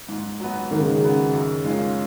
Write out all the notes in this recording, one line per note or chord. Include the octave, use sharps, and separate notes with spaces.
G#2
F#3 B3
G#2 D#3
C#3
C#3
F#3 B3
F#2
D#3 G#3 C#4 F4